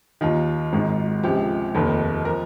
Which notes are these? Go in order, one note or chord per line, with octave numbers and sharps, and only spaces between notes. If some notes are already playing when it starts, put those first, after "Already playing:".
D#2 D#3 F4
G#1 G#2 D#3
C#2 C3 F3 G4
F1 D#2 D#3
F3 A#4